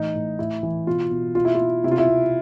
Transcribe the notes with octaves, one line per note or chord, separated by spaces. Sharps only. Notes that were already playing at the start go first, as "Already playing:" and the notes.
Already playing: A2 E3 D#4
A2
A2 E4
E3
B2 F4
B2
B2 F4
E4
F4
B2
C3 E4
F4
E4
C3